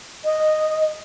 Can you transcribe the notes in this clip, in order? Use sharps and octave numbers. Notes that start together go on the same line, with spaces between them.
D#5